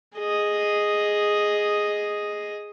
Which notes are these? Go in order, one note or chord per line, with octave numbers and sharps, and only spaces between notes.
G#4 D#5